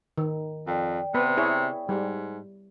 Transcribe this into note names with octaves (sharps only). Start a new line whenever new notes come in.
D#3
F2 D5 G5
C3 B3 B4
E4 G#4 C#5
G#2 G3